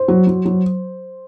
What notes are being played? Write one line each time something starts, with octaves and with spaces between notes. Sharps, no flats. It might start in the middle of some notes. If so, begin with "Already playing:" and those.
Already playing: C5
F#3
F#3
F#3